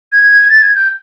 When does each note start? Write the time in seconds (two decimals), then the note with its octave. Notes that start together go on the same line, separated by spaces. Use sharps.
0.12 G#6
0.49 A6
0.62 G#6
0.75 G6